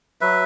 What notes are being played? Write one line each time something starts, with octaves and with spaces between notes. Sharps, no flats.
F#3 B4 E5